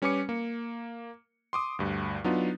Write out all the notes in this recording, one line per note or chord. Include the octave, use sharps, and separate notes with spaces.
G3 C#4 B4 G#5 D6 C#7
A#3
C6 D6 D#6
D2 G2
F#3 B3 D4 D#4 F4